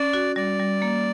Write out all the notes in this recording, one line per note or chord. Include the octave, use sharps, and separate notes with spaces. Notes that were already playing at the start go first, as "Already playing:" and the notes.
Already playing: C#4 D5
F#4
G3 D5
G3
A#3